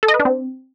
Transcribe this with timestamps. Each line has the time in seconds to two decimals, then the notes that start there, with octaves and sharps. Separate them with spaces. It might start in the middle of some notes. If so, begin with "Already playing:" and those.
0.03 A4
0.08 D#5
0.14 B4
0.20 D4
0.25 C4